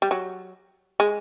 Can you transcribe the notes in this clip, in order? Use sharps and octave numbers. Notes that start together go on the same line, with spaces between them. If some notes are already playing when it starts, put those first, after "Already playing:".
G3
F#3
G#3